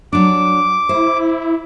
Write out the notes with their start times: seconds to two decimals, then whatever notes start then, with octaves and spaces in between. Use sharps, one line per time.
0.13 F#3 D4 D6
0.89 E4 C5